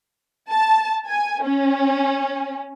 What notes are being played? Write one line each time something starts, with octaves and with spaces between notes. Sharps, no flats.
A5
G#5
C#4